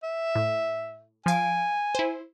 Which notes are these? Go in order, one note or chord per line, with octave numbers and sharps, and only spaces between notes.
E5
A2
F3 F5 G#5 D7
E4 C5